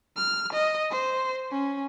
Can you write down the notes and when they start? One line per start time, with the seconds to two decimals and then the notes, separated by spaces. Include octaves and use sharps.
0.17 F6
0.53 D#5
0.91 C5
1.51 C#4